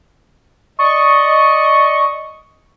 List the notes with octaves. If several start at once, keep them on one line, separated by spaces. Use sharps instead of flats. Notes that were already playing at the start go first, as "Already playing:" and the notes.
D5 D#5 C#6